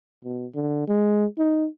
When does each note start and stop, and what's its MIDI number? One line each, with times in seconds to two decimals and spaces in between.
0.24 0.46 47
0.55 0.84 50
0.88 1.25 56
1.38 1.67 63